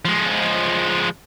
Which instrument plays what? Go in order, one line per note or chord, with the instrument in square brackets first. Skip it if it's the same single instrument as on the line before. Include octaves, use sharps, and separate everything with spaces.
[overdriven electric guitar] F3 G#3